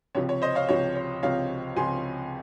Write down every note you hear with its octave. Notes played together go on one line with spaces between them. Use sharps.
C#2 C3 F3 C#5
C#5
C5 D#5
C#5 F5
C#2 C3 F3 C#5
C#5
C#2 C3 F3 C#5 F5
C#2 C3 F3 G#5 C6